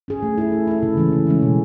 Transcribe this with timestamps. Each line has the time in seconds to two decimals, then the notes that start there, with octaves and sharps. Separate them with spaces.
0.08 C#4 G#4
0.23 A3
0.38 E4 A4
0.52 A3
0.67 E4 A4
0.83 C#3
0.97 E3 G#3 C#4
1.12 C#3
1.27 E3 G#3 C#4
1.42 B2